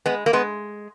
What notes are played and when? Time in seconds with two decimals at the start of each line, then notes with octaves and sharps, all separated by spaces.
0.06 G#3 B3
0.26 A#3
0.33 G#3 B3